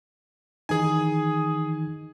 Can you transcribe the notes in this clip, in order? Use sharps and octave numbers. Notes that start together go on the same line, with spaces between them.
D#3 E3 D#4 G#4 G#5